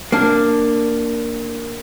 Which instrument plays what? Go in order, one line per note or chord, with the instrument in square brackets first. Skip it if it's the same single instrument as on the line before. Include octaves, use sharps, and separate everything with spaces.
[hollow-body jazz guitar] A#3 D4